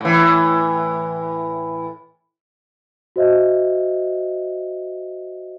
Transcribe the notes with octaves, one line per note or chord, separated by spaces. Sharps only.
A2 E3
F#4 C5 D#5 E5